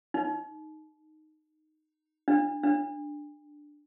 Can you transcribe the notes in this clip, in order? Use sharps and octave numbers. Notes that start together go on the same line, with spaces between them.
D#4
D4
D4